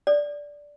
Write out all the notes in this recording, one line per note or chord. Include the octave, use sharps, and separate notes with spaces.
D5